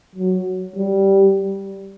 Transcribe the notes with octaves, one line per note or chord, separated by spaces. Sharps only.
F#3
G3